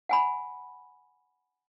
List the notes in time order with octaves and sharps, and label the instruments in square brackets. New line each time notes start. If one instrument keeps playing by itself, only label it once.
[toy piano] F#5 G#5 B5